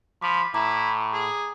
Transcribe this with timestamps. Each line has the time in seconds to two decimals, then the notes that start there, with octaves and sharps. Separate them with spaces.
0.22 F3 B5 D6
0.54 A2 E4 A#5 D6
1.13 G#4